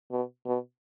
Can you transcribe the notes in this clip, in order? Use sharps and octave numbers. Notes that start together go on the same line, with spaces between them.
B2
B2